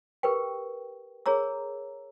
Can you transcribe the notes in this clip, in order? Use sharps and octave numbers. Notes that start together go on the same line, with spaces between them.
G4 A#4 B4 G5
G#4 A#4 C#5 A#5 E6